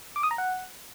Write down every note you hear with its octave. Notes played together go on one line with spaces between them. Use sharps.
D6
D#6
A#5
F#5